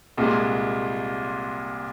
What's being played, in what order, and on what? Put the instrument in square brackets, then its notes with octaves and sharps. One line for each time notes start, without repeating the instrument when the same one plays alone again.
[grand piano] C2 A#2 G#3